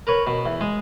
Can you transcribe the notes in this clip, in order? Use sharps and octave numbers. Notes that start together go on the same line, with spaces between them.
A#4 B4 C#5
B2
E2
G#3 G#4